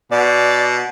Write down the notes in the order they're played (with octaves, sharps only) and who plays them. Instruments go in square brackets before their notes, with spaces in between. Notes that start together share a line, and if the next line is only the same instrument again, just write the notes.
[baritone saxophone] B2 [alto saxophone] D5